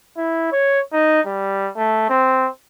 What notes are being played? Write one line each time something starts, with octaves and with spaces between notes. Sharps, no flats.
E4
C#5
D#4
G3
A3
C4